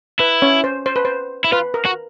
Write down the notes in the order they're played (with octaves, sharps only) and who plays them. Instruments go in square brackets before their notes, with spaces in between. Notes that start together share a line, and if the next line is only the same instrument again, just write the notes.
[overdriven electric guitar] E4 [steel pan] B4
[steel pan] C#4 C#5
C5
C5
B4
C5
[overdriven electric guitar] E4
[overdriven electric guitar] F4 [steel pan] B4
[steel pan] A#4
[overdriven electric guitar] F#4